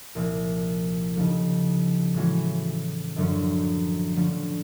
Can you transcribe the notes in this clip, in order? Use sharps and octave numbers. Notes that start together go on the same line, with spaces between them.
C2 A#2 F3 A#3
D#2 C#3 F3 A3
A2 E3 G#3 C#4 F#4
F#2 D3 F3 A3 C#4
D3 F3 A3 C#4